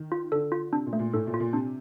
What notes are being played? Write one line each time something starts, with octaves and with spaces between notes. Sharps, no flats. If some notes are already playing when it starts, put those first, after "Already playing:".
Already playing: D#3
F4
D3 A4
F4
C3 D4
A#2
A3
A#2
A2 A4
A#2
F4
A#2
C3 D4